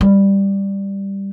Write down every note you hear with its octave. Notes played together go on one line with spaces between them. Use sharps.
G3